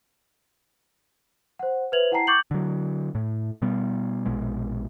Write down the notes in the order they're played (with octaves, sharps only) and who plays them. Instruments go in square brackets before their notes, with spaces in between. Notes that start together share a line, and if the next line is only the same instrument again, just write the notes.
[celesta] C5 F#5
B4 C5 E5 G#6 F7 F#7
E4 F#5 G5 A5 A#5 C7
C#6 D6 G6 A6 C#7 F#7
[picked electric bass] D3 F#3
A2
B2 G3 B3
A#1 B2 G#3